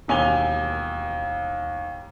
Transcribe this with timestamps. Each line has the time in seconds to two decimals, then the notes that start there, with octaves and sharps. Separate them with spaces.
0.08 E1 D#2 G#5 F7 G7